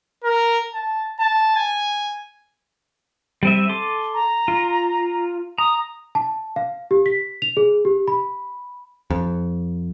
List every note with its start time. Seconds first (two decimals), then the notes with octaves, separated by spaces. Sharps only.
0.24 A#4
0.74 A5
1.20 A5
1.56 G#5
3.43 G3 C4 E5 D#7
3.69 A4 C6 D6
4.14 A#5
4.48 F4
5.58 A#5 D#6
6.15 A5
6.56 F5
6.91 G4
7.06 B6
7.42 F7
7.57 G#4
7.85 G4
8.08 B5
9.10 F2